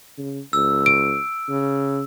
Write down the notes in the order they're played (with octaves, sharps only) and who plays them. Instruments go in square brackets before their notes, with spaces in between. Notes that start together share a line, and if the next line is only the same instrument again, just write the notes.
[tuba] C#3
[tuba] C#2 [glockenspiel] E6
[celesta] D7
[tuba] C#3